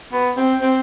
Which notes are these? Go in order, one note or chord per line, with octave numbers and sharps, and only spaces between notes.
B3
C4
C4